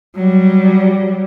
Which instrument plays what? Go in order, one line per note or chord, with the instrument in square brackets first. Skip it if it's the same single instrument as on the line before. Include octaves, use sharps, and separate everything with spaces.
[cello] F#3 G3